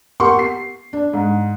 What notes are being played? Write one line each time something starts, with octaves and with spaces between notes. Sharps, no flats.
G4 A#4 F#5 C6 C#6
C7
D4
G#2